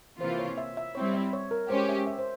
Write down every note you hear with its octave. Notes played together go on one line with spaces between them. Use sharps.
C3 E3 A#3 F4 C5
C#5
E5
E5
G3 C4 E4 C#5
E5
C#5
A#4
G#3 C#4 G4 C5
E5
E5
C5